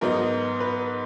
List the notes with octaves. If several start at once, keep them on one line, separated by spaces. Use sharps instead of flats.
G#2 F#3 B3 D#4 A#4
B4